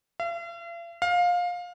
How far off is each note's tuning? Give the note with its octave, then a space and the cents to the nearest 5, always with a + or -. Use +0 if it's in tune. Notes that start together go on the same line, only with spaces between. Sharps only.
F5 -45
F5 +20